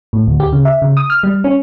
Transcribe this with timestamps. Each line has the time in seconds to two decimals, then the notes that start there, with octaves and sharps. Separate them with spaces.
0.13 A2
0.27 D2
0.40 G4
0.53 C#3
0.65 E5
0.82 C#3
0.97 D#6
1.10 F6
1.23 G3
1.44 C#4